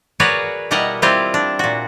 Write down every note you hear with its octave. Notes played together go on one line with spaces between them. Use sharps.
F#4 G#4 A#4 B4 C#5 D5
B2 G3 E4 A#4 D#5 F#5
G3 C4 E4 F4 G4
D4
A#2 F#4